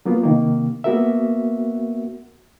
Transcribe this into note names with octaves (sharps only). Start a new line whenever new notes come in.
F#3 A#3 B3 F4
C3 D#3 A#3
A#3 B3 F#4 A#4 E5